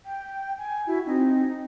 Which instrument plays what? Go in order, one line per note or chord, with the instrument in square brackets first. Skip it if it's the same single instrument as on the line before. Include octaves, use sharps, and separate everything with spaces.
[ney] G5
G#5
[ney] E4 [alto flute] F#4
[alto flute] C4 [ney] D#4